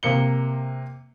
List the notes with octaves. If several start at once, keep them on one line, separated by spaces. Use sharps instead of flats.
C3 A#3 C#7 G7